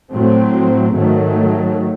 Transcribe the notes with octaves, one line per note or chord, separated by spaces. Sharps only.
A2 F#3 A3 C4
G#2 D#3 F#3 A3